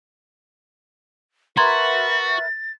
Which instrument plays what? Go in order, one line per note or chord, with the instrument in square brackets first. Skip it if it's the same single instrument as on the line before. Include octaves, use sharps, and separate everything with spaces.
[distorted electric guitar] F#4 [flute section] A#4 B4 E5 [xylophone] A#5 C6 G#6 [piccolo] A6